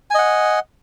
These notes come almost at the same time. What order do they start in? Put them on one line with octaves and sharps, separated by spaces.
G#5 D#5 F#5